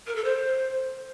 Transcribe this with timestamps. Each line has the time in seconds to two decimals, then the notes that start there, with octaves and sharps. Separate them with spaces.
0.06 A#4
0.15 A4
0.24 C5